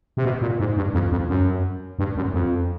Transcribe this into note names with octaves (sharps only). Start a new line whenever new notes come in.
C3
B2
A#2
G#2
G2
F2
F2
F#2
G2
F#2
F2